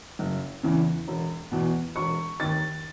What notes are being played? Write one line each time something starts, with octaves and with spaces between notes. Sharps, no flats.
F#1
E2 C#3 E3
E1
E2 B2
E1 C#6
D#2 D#3 A6